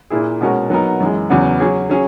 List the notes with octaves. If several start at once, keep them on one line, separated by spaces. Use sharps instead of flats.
A#2 A#3 E4 G#4
B2 G#3 C#4 F#4 A#4
F#3 B3 D#4 A#4
F#2 E3 G#3
E2 C#3 F#3 B3
F#3 C#4 G#4
F#3 C#4 G#4